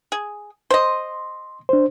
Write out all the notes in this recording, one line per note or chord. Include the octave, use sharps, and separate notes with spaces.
G#4
C5 D#5 C6
D4 C5